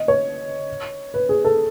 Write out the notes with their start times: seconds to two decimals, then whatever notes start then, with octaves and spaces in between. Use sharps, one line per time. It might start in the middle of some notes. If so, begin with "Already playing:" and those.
Already playing: D#5
0.08 C#5
1.14 B4
1.29 G#4
1.45 A4